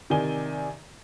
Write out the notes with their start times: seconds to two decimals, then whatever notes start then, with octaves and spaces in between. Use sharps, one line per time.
0.10 C3 D#3 D5 G#5 G7